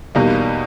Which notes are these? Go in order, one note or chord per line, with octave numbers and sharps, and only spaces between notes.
E2 B2 G3 A#3 D#4